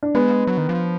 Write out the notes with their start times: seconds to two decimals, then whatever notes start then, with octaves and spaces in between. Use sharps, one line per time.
0.03 D4
0.15 G#3 B3
0.47 F#3
0.58 D#3
0.69 F3